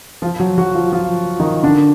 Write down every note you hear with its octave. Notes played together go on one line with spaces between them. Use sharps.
F3 F4
F#3 F#4
F#3 F#4
F3 F4
F3 F4
D#3 D#4
D3 D4